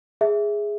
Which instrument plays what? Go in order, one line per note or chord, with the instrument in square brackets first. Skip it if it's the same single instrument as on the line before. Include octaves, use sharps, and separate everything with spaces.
[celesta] G#4 E5